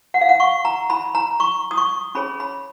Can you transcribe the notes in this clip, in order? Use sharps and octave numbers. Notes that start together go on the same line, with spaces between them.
F#5
F5
F#5
C#6
A#5
B5
A#5
C#6
D#6
C#6
C#4 G#4 C#5 B5
B5